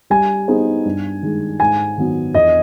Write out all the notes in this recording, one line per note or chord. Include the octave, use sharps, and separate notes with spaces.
G3 G#5
B3 D#4 G#4 C5
G2
D#3 G#3
G#2 G#5
D#3 F#3 B3
E2 D#5